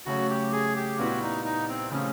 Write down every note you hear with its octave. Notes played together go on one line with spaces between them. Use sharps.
C#3 F#3 A3 C#4 F#4
G4
G#4
G4
A#2 G3 B3 E4 F#4 G4
D#4
D#4
C4
C#3 F3 A3 C4 C#4